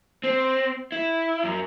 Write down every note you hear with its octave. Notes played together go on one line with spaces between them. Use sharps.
C4
E4
F#2